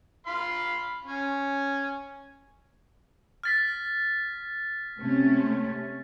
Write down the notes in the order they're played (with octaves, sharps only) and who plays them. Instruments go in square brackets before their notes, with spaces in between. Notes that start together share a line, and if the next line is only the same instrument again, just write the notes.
[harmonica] F5 B5 C6
C#4
[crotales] F6 A6 B6
[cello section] C3 A3 C#4